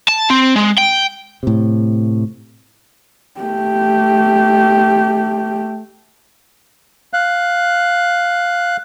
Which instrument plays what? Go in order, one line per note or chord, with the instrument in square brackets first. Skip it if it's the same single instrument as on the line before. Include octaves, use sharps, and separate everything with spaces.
[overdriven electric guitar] A5
C4
G#3
G5
[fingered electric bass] A2 C3
[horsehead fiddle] A3 G4
[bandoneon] F5 F#6